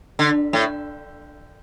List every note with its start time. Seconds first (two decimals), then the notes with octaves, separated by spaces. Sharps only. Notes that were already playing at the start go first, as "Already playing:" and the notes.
0.19 D3
0.53 A2